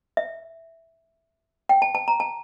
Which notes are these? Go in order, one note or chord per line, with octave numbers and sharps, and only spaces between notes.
E5
G5
A5
A5
A#5
A5